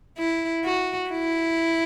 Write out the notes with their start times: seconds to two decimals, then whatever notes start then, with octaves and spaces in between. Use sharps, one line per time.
0.18 E4
0.65 F#4
1.10 E4